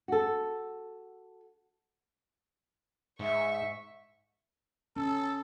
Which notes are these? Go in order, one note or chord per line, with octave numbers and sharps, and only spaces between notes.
F#4 A4
G#2 E5 C#6
C#4 A4